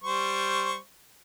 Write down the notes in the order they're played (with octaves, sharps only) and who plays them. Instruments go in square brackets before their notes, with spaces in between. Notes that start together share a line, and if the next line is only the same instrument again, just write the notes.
[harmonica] G3 C5 C#6